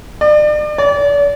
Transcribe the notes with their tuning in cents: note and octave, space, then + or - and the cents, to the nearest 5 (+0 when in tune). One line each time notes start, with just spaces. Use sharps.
D5 +35
D5 -40